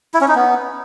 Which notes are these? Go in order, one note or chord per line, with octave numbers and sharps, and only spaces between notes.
E4
C#4
D#4
B3